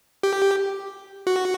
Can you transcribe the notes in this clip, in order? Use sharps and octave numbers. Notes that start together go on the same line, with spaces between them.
G4
F#4